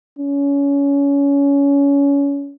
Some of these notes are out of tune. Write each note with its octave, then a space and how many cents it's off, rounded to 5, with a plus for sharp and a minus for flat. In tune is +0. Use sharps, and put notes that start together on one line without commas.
C#4 +25